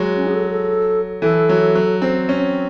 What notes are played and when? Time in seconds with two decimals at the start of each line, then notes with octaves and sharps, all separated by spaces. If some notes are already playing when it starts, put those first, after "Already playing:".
Already playing: F#3 G#3
0.16 C#4
0.27 G#4
0.34 A4
0.51 A4
1.22 E3 A4
1.49 F#3
1.75 F#3
2.02 C4
2.29 C#4